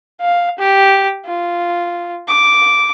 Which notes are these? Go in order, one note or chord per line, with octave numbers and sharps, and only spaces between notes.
F5
G4
F4
D6